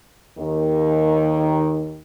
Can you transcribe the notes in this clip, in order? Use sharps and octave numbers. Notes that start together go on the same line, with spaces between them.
D#2 D#3